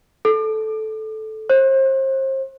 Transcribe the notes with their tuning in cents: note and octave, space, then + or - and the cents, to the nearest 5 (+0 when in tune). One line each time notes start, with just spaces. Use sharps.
A4 -10
C5 +35